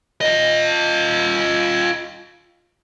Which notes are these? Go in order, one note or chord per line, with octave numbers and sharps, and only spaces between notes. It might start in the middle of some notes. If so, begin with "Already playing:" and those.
F4 D#5